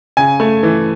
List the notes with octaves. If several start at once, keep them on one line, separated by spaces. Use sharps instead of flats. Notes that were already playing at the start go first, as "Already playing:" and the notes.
C#3 G#5
A3
E3